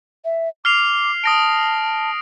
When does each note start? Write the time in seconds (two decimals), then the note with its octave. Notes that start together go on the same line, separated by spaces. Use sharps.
0.25 E5
0.65 D6 F6 C7 F7
1.24 A5 D#6 A#6 D7